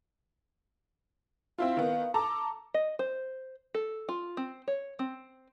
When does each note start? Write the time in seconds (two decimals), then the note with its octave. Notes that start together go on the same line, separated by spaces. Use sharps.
1.58 C4 E4 F4 F5
1.77 D#3 B3
2.14 A4 A5 A#5 D6
2.74 D#5
2.99 C5
3.74 A4
4.09 F4
4.37 C4
4.68 C#5
4.99 C4